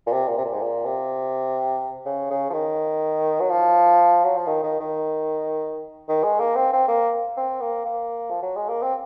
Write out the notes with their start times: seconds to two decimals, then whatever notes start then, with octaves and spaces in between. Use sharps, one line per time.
0.07 A#2
0.12 C3
0.28 A#2
0.38 C3
0.45 A#2
0.53 G#2
0.61 A#2
0.85 C3
2.05 C#3
2.30 C#3
2.50 F3
2.53 D#3
3.41 F#3
3.50 F3
4.24 F#3
4.36 F3
4.47 D#3
4.64 D#3
4.80 D#3
6.09 D#3
6.24 G#3
6.40 A#3
6.56 C4
6.73 C4
6.88 A#3
7.37 C4
7.61 A#3
7.85 A#3
8.30 F3
8.42 F#3
8.56 G#3
8.69 A#3
8.82 C4